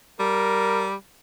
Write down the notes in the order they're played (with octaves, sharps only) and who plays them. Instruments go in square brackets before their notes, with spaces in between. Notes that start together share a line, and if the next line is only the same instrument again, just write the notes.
[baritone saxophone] G3 [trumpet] A#4